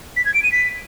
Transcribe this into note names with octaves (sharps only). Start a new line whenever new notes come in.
B6
G#6
D7
D#7
B6